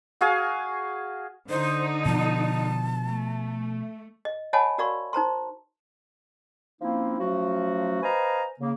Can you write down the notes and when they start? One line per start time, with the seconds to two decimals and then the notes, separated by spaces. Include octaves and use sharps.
0.21 F#4 G#4 F5 G#5
1.50 D3 D#4 C5
2.06 B2 F3 A5
3.06 A3
4.25 D#5
4.53 C#5 D#5 F#5 G#5 A5 B5
4.78 F#4 A#4 D5 F5 B5 C#6
5.13 D#4 C5 A#5 C6
6.81 F3 A#3 C4 C#4 D#4 E4
7.20 F3 F#3 A3 C#4 F#4
8.03 B4 C5 D#5 F5 G#5 A#5
8.60 C#3 A#3